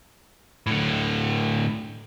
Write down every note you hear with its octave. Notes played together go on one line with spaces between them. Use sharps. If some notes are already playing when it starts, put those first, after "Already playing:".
A2 D3